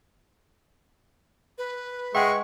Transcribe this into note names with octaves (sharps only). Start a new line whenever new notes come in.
B4
G#3 E5 F#5 G5 C#6